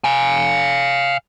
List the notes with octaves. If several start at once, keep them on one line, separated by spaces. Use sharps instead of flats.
F5 G#5